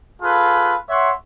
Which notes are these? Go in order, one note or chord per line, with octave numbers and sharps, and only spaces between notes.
F4 G#4 A4 B4
C#5 E5 F#5 C6